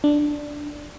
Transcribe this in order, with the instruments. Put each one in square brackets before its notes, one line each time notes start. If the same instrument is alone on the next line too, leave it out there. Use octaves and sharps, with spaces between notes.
[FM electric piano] D4